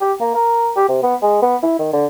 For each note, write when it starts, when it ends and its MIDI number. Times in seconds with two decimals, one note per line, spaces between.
0.01 0.13 67
0.20 0.30 58
0.35 0.71 70
0.76 0.88 67
0.89 1.00 48
1.03 1.16 59
1.22 1.41 56
1.42 1.56 59
1.63 1.78 64
1.79 1.90 51
1.93 2.06 50